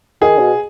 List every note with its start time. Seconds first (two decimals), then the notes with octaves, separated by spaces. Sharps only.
0.21 D#3 G#4
0.38 B2